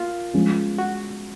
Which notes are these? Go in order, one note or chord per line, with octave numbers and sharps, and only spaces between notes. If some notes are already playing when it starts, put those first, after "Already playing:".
Already playing: A#3 F4
F3 G#3 C#4
F#4